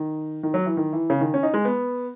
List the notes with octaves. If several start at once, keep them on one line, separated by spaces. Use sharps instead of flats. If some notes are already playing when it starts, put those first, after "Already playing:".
Already playing: D#3
D#3
F#3
E3
D#3
E3
C#3
D#3
C#4
D#4
G#3
B3